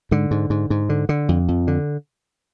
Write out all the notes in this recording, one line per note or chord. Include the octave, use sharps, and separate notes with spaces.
G#2 D3
G#2
G#2
G#2
D3
D3
F2
F2
D3